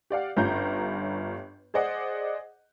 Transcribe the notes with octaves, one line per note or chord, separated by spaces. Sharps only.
G4 D5 F5 F#5
G1 G2 C#4 F4 A#5 G6
G#4 C5 D5 D#5 F#5